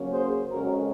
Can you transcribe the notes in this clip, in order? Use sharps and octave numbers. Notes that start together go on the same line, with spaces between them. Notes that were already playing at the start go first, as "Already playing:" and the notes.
Already playing: C#3 F#3 A#3 C#4
G#4 C5
F2 C#3 G#3 C#4 F#4 A#4